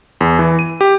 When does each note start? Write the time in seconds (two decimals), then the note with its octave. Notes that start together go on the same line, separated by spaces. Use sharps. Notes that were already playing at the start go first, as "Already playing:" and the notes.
0.21 E2
0.39 E3
0.59 D#7
0.81 G4